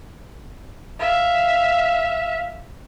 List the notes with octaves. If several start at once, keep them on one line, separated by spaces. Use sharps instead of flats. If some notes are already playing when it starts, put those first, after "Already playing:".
E5 F5